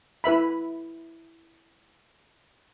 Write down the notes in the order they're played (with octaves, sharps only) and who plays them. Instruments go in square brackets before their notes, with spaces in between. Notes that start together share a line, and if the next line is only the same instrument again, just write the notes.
[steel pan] E4 B4 E5 B5